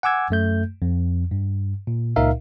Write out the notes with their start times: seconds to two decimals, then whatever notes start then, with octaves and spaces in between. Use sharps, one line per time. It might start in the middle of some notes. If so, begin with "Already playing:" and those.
0.03 F#5 G#5 D6 E6 G#6
0.30 F#2 A3 G6
0.82 F2
1.31 G2
1.87 A#2
2.16 C#2 A#2 D#4 A#4 E5 F5